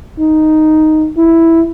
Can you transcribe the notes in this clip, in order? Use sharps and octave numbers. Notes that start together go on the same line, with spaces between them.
D#4
E4